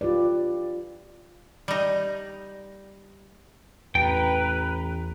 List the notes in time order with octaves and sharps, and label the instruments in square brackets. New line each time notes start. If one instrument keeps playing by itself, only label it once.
[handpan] F4 G4 B4 D5
[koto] G3 D#4
[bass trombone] A1 [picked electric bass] E2 [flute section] B4 A#5 [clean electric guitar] G5